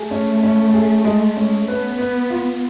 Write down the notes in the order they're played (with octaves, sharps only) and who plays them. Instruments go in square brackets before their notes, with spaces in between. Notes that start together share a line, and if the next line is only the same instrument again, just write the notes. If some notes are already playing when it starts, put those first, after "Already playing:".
Already playing: [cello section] A3 [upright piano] G#4
[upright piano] C#4
C#4
G#4
G#3
C#4
[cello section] B3 [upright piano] B4
[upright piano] B4
F4